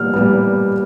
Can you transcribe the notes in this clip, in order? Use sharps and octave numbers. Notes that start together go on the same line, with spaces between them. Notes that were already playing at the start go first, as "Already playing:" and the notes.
Already playing: A#2 G3 B3 F6
A#2 G3 B3